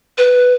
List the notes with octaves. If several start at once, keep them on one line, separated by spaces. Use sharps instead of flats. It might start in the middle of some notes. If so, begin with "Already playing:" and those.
B4